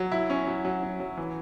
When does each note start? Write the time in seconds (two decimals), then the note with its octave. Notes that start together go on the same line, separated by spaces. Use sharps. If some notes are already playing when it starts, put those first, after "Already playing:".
Already playing: F#3
0.12 E4
0.30 C#4
0.47 F#3
0.65 F#3
0.83 F#3
1.00 F#3
1.17 E3